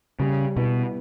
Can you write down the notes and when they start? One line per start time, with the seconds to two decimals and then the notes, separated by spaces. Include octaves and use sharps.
0.20 C#3 G3
0.56 B2 B3 E4